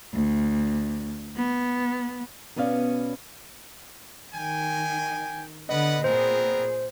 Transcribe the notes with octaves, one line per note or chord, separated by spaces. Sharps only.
D2
B3
B2 B3 C#4 D5 F5
D#3 G5 G#5
D3 B3 B4 D#5 F#5
A#2 B3 C4 G#4 A#4 C5